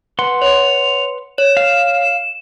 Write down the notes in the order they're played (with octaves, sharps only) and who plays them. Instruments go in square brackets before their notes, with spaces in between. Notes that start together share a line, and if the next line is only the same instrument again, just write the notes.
[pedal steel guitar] B4 F#5 C6
[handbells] C#5 [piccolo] F7
[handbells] C#5 [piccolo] E7
[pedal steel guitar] F5